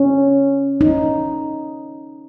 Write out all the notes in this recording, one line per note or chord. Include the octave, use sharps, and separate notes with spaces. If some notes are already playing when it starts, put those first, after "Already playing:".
Already playing: C#4
D#4